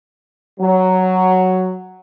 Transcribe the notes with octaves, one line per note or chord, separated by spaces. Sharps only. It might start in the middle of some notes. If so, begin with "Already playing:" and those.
F#3